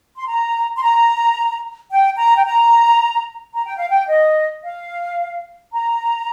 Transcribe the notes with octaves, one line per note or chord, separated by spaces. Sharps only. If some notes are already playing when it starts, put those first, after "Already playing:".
C6
A#5
C6
A#5
G5
A#5
G5
A#5
A#5
G5
F5
G5
D#5
F5
A#5